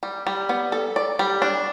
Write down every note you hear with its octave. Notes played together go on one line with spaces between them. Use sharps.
G3
G3
B3
A4
D5
G3
D4